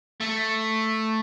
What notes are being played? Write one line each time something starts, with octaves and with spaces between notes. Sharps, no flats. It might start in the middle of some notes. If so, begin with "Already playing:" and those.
A3